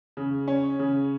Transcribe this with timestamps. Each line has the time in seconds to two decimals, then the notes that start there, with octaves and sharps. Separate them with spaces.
0.17 C#3
0.48 C#4
0.79 C#3